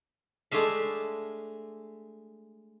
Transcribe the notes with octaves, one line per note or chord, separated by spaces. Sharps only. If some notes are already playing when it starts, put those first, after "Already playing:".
G#3 A3 D4 E5 F5